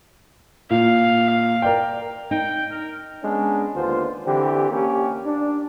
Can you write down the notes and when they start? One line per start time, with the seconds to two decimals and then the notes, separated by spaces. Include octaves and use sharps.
0.70 A#2 F5
1.62 A#4 D5 G5
2.31 D#4 G5
2.71 A#4
3.23 G#3 B3 C#4 D4
3.75 D#2 D3 B3 F4 C5
4.26 D3 E3 C4 G4
4.71 A#3 C#4 G4
5.25 D4